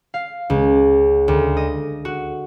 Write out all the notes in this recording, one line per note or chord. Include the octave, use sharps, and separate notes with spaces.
F5
C#2
D2
D#5
F#4